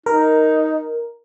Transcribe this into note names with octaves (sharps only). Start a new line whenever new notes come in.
D#4 A#4